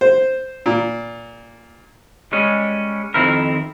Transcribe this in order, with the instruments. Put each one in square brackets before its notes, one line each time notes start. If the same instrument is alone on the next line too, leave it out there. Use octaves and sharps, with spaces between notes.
[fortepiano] C5
A#2
[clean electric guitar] G3 G#3 C#4
F2 B2 D#3 C4 E4 A#4